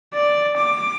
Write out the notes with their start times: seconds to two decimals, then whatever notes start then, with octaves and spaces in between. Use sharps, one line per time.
0.14 D5
0.57 D6